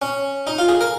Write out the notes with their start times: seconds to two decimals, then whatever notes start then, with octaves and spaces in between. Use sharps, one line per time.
0.02 C#4
0.47 D#4
0.58 F4
0.68 G#4
0.81 A#4